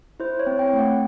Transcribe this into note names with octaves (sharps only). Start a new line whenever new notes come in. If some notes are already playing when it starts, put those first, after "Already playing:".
E4 C5
C#5
C4
G5
A3
F#5